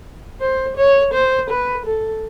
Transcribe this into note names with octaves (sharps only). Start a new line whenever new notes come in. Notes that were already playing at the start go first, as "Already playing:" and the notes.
C5
C#5
C5
B4
A4